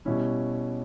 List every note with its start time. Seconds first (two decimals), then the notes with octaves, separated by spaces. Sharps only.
0.05 B2 G3 C#4 E4